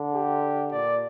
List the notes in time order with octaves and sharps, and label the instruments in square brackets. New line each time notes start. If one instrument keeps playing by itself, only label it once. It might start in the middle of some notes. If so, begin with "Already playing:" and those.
Already playing: [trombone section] D3
[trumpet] G4
[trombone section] A#2 [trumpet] D5